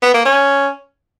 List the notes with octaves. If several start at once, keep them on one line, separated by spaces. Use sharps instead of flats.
B3
A#3
C#4